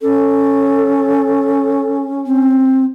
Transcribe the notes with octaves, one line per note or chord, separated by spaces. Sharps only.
C#4 A4
C4